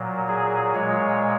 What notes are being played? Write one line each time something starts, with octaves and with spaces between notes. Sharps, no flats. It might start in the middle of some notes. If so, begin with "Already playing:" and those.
Already playing: A#2 F#3
G#4
A#2 G#3 C#5